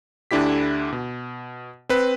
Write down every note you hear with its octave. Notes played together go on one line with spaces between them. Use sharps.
D2 D3 D4 E4 G4 B6
B2
C4 B4